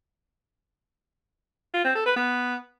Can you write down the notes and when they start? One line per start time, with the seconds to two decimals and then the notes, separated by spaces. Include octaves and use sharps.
1.74 F4
1.84 C4
1.95 A4
2.06 B4
2.16 B3